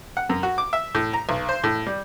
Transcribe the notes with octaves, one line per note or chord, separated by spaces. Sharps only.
F#5
F#2
F#4
D6
E5
A2
A#5
B1
C5
A2
G3